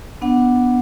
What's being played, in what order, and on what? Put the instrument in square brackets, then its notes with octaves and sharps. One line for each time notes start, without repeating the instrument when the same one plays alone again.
[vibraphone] B3 D4 F#5